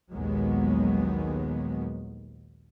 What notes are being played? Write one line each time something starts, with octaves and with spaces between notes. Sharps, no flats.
A#1 D#2 D#3 F#3 G#3 B3